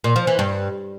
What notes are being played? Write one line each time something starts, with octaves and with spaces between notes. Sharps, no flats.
A#2
F3
E3
G2